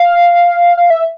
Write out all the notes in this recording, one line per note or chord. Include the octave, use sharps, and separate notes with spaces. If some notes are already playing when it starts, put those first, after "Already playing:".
Already playing: F5
F5
E5